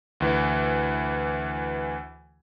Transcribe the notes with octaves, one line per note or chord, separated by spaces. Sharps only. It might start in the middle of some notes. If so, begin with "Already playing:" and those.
D2 E3